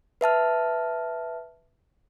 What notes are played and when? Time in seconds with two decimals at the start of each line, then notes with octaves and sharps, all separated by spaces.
0.21 B4 E5 A5 F6